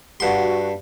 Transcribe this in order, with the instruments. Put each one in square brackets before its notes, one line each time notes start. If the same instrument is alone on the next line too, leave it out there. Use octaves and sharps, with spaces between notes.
[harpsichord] G2 C6 [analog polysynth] F#4